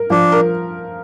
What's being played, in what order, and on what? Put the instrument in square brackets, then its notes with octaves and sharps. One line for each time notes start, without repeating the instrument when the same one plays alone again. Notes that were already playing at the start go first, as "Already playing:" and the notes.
Already playing: [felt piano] A#4
[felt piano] F3 [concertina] D4
[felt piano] A#4